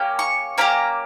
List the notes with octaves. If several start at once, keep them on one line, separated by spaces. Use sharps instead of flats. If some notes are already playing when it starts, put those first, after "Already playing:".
Already playing: A#3 C#4 G4
C#6
A#3 C#4 G4 A#5